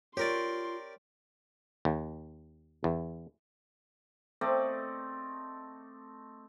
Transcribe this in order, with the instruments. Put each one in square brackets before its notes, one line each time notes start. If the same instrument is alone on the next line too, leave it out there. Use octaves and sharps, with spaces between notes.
[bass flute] F4 [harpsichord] G4 A#4 D5 [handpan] C#5 [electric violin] C6
[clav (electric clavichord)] D#2
E2
[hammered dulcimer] A3 C4 D5 D#5